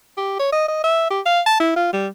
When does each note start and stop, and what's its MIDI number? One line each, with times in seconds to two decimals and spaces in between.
0.17 0.39 67
0.40 0.48 73
0.52 0.67 75
0.68 0.80 75
0.84 1.07 76
1.11 1.21 67
1.26 1.41 77
1.46 1.57 81
1.60 1.73 64
1.76 1.88 65
1.93 2.08 55